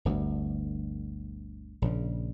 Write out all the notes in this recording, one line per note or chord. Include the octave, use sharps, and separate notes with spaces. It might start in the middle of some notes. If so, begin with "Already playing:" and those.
G1 D2
A#1 C#3